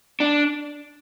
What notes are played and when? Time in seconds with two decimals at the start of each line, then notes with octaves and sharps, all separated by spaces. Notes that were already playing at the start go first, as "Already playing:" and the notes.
0.20 D4